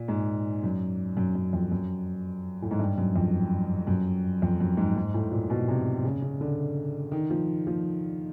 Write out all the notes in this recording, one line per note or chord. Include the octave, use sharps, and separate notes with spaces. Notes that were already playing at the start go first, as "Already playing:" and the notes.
Already playing: A#2
G#2
F#2
F#2
F#2
F2
F#2
A2
G#2
G2
F#2
F2
F#2
F2
F#2
G#2
G#2
A2
A#2
B2
C3
C#3
C#3
D3
D#3
F3
F3